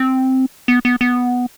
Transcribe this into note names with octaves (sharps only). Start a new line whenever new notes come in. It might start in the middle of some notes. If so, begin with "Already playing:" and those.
Already playing: C4
B3
B3
B3